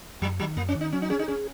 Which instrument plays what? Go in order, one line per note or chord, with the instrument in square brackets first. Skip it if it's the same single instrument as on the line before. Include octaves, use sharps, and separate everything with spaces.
[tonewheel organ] F#2 [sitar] F#3
[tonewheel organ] D#3 [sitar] F#3
[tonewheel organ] F#2 [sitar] A#3
[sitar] C#4
[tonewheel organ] D#3
[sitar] D#4
[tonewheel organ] F#3 [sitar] C#4
[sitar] D#4
[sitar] C#4 [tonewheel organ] G#4
[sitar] D#4
[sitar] C#4 [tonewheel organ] G#4